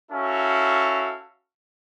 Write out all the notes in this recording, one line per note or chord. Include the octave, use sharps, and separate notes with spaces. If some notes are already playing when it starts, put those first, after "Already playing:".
C#4 E4 F#4 A4 F5